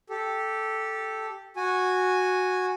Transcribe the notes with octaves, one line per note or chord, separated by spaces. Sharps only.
G4 A4
F#4 G#5